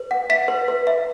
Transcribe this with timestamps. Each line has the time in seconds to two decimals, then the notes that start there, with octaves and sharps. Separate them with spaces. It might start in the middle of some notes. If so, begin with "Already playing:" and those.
Already playing: B4
0.11 F#5
0.30 E5 B6
0.48 B4
0.68 B4
0.87 E5